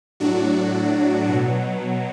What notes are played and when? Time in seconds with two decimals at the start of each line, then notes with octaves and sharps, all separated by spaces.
0.20 A2 F#3 D4 F#4
1.29 B2 F#3